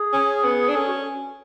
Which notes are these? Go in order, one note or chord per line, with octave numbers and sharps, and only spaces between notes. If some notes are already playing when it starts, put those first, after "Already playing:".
Already playing: G#4
C#4
B3
D4
C#4 A4
F#4